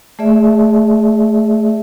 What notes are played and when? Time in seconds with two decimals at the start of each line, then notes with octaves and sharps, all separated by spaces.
0.19 A3 G#4 D5 E5